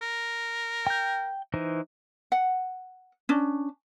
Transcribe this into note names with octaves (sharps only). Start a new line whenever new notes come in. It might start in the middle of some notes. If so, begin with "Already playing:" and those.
A#4
G5 G6
E3 D#4 C5
F#5
C#4 D4